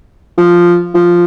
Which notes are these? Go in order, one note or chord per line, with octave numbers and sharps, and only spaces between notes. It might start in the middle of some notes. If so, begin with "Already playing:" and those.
F3
F3